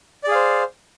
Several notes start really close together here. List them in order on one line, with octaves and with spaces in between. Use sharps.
D5 G#4 F5 C5